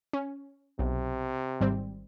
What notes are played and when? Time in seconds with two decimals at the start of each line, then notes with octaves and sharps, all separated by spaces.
0.13 C#4
0.79 B1 C3
1.60 G#1 G3 C4